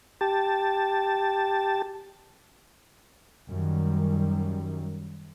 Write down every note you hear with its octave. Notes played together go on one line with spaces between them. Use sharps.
G4 A5
F#2 D#3 G3